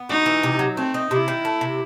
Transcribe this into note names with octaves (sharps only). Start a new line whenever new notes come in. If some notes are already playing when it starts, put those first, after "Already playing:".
Already playing: B3
D#4 F#4
E3
C3
F#3
A3 C4
D#4
C3 E4
D#3
A3
C3